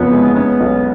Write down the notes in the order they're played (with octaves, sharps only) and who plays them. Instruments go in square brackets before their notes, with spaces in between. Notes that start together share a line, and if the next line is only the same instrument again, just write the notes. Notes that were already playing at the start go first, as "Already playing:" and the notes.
Already playing: [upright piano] F#1 F2 C#3 [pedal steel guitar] B3
[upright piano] G#3
[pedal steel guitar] B3 [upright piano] C#4
[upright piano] B1